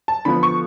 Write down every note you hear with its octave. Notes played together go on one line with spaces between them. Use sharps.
A5
D3 F3 B3 B5
C#6